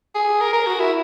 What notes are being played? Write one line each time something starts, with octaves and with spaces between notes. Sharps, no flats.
G#4
A#4
A#4
F#4
E4